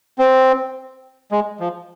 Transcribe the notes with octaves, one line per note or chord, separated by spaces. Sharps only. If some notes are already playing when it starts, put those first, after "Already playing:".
C4
G#3
F3